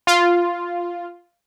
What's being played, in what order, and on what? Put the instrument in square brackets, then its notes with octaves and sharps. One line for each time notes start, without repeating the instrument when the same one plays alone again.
[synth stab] F4